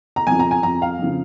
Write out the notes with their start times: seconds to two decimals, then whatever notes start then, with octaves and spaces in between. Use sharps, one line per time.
0.16 A#5
0.27 F2 F3 G#5
0.39 A#5
0.51 G#5
0.63 F2 F3 A#5
0.82 F5
0.99 F2 C#3 F3